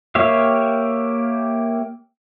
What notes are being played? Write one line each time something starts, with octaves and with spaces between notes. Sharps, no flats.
A#3 G4 C#5 E5 F5